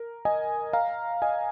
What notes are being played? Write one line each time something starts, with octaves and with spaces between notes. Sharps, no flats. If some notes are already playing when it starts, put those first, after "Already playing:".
Already playing: A#4
D#5 G#5
F5 A#5
D#5 G#5